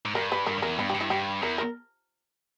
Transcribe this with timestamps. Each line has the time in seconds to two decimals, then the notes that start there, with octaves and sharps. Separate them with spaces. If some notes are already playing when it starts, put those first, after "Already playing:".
0.05 G#2
0.15 G2 A#4
0.32 B4
0.46 G2 A#4
0.58 G2
0.62 E2 A#4
0.79 G2 B3
0.89 G4
0.95 G2
1.01 E4
1.10 G2 G4
1.42 E2 A#4
1.58 A#4